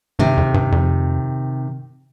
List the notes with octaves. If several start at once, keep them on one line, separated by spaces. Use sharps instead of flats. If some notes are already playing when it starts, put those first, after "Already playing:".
G2 C3 D#3
F2
G2
F2